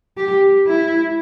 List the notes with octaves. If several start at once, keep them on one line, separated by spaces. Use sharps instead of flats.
G4
E4